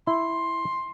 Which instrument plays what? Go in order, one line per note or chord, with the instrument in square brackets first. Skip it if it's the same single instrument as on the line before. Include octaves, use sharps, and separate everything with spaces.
[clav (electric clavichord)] E4 [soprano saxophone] C6